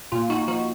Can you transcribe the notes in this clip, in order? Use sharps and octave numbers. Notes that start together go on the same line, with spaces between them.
A#2 F4
A#2 D#4 F#4
F3 D#4 F#4